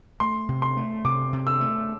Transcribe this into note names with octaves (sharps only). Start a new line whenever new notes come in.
A3 C6
C3
C6
A3
C3 D6
C3
E6
A3